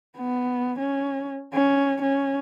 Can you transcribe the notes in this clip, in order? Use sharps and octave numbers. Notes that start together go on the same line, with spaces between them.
B3
C#4
C#4
C#4